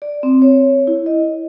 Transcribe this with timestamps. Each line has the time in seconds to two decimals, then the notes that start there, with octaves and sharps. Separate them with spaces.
0.02 D5
0.23 C4
0.42 C#5
0.87 E4
1.06 D#5